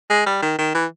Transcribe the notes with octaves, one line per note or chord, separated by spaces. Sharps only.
G#3
G3
D#3
D#3
E3